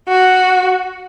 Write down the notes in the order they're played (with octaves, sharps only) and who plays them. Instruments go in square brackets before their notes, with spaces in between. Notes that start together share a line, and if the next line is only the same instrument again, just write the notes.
[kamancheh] F#4